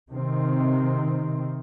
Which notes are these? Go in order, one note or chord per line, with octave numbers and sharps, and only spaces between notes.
C3 D#3 C4